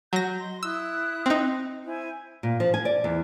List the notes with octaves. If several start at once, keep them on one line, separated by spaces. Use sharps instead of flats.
F#3 G6 A#6
D#5 C6
E4 D#6 E6 F#6
C4 D#4
E4 C5 G#5
A#2
F3
G#5
D5
E2